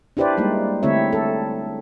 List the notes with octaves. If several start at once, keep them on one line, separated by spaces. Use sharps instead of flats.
D4 E4 G4 B4 C5 D5
G3 G#3 A#3 D#4
D3 A3 C4 E4 C#5 E5
A4